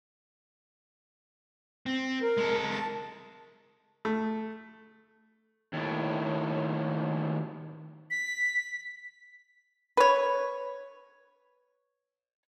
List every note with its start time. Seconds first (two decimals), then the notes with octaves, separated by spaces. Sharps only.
1.86 C4
2.23 A#4
2.37 G#3 A4
2.70 A5
4.05 A3
5.73 D#2 A2
8.11 B6
9.97 B4 C#5